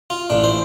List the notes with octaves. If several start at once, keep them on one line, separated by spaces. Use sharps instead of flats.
F4
A1 A2 D4
C5